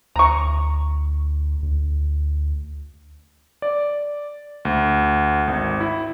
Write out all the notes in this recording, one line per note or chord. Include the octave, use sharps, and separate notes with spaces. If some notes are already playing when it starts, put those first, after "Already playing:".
D2 A#5 C#6
D2
D5
D2
G#1
E4